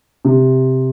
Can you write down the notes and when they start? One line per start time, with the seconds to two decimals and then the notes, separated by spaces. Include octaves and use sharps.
0.25 C3